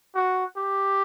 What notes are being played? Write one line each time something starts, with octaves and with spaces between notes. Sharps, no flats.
F#4
G4